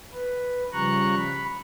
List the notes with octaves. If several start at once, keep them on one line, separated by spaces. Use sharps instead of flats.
B4
C#3 F3 G3 A#5 C#6 F#6
B5